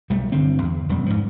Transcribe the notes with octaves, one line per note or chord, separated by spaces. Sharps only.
B1 G3 A3
G1 D3 C4
E2
E1 F#2 G3
G#2 F3